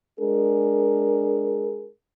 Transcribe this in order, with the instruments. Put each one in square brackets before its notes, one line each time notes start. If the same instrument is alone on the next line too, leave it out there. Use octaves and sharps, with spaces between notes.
[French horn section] G#3 D4 G#4 A#4